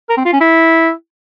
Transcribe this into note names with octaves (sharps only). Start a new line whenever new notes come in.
A#4
C4
F4
C#4
E4